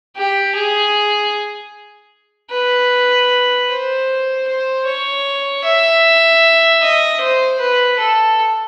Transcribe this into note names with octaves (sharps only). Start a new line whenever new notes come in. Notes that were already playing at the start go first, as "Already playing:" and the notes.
G4
G#4
B4
C5
C5
C#5
E5
D#5
C5
B4
A4